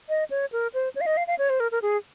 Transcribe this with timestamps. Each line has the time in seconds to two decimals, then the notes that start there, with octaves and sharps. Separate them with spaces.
0.09 D#5
0.30 C#5
0.52 A#4
0.74 C5
0.95 C#5
1.01 F5
1.06 D#5
1.17 F5
1.27 F5
1.38 C#5
1.50 C5
1.60 A#4
1.71 A#4
1.82 G#4